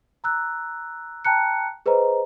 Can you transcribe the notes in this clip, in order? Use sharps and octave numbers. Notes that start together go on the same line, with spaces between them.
A#5 E6 F#6
G5 A5 A#5 F#6 C#7
G#4 B4 C5 D#5 A#5